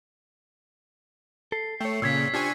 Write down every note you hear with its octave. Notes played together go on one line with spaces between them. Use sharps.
A4 C7
A3 C#5 G5
A#2 C#3 E6 G#6 B6
D4 F4 G4 C5 G#5 C#6